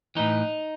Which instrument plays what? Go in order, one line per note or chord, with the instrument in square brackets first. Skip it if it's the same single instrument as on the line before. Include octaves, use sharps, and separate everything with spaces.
[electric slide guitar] A2 E3 D#4